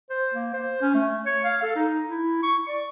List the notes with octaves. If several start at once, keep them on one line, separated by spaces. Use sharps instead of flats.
C5
A#3
C5
C#4
A3
C#5
F5
A4
D#4
E4
C#6
D5